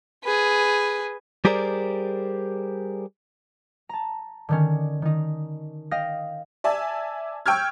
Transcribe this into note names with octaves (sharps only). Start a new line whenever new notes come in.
G#4 B4
G3 G4 G#4 A#4 C5 D5
A5 A#5
D3 D#3 C#4
D#3 D#4
D#5 F5 G5 D#6 A#6
D5 E5 G#5 A5
G5 C#6 E6 F6 G#6